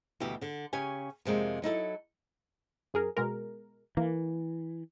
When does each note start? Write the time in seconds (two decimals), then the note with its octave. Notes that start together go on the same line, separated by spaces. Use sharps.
0.20 D2 B2 E3 E4 G4
0.41 D3 D4
0.73 C#3 C#4 G4 G#5
1.25 F2 C3 G#3 A#3
1.62 F#3 D#4 E4 A4
2.94 F#2 G#4 A#4
3.17 B2 G#3 A#4
3.97 E3 A#3